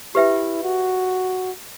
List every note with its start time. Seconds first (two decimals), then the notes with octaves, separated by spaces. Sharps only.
0.15 E4 G4 B4 E5 G5
0.64 F#4